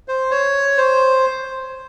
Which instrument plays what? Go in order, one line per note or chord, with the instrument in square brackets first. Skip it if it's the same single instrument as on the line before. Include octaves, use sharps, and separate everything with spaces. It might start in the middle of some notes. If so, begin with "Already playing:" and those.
[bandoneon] C5
C#5
C5